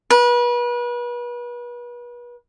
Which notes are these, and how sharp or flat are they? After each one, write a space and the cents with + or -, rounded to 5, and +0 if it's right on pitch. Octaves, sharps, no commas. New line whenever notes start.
B4 -35